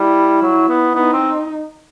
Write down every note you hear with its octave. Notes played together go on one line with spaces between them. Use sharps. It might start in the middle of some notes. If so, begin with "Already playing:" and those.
Already playing: G3 E4
F#3
B3
B3 D#4
C4